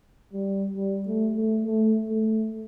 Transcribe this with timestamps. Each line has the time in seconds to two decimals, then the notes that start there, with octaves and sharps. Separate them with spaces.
0.33 G3
0.77 G3
1.07 A3
1.36 A3
1.64 A3
2.09 A3